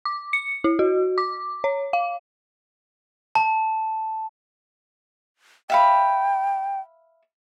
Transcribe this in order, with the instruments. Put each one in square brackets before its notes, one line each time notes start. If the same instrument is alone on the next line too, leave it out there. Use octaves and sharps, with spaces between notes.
[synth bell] D6
C#7
E4
F#4
D6
C#5
F5
[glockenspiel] A5
[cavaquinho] E5 F5 B5 [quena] G5